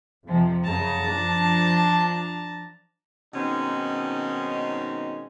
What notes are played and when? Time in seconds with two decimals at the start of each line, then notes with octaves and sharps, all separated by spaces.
0.25 F2 C3 F3
0.64 F#2 C#3 A5 A#5
1.02 F3 D4
3.34 B2 D#3 G#3 C4 C#4 D#4